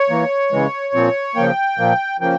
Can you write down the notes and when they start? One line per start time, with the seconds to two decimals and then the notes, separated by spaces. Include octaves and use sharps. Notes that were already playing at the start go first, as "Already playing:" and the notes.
Already playing: C#5
0.10 E3 A#3
0.52 C#3 E3 G#3
0.94 A#2 F3 C4
1.36 C#3 F3 A#3 G5
1.78 A#2 F3 A#3
2.21 C#3 F3 A#3 G5